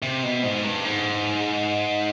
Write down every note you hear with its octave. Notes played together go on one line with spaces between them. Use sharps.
C3
B2
G#2
G2
G#2